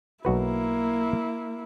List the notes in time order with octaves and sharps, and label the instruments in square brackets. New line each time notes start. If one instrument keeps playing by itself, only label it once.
[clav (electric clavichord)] B1 F#4 B4 [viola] A#3 E4